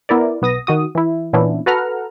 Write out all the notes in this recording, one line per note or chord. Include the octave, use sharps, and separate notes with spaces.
B3 E4 A#4 D5
B1 B3 D#6 A#6
D#3 F#4 D#6
E3 E4
A#2 E3 B3 C#4 D4 E4
F#4 A4 B4 F#5 A#5 F6